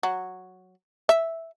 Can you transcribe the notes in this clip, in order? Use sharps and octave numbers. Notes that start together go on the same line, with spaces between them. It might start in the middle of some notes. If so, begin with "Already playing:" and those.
F#3
E5